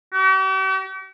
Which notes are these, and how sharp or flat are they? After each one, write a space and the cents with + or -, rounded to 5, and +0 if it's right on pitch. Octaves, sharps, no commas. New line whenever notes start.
G4 -45